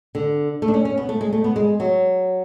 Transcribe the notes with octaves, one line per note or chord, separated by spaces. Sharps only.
D3
A3
D4
C#4
C#4
B3
A3
G#3
A3
B3
G#3
F#3